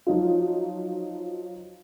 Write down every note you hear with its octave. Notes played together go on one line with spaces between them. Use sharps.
F3 F#3 D#4 F4